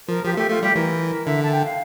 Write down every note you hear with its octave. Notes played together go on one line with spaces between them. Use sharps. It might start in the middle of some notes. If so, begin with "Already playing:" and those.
F3 A#4
F3 G4
F4
A3 G4
A3 F4
G3 G4
E3 A#4
D3 E5
A5
G5
F5